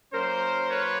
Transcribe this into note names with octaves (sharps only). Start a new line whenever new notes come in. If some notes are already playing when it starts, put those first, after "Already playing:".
F#3 A#3 C#4 A#4 C5
B4 C#5